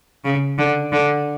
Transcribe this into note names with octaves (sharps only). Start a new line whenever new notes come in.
C#3
D3
D3